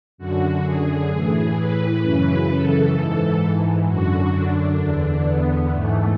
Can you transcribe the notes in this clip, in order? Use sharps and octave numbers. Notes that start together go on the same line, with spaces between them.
F#2 D3 F#4
G#4
A2 E3
B4
F#2 C#3 E3
A4
G#2 E3
F#2 D3 F#4
D4
E2 D3
B3
G#2 E3 A3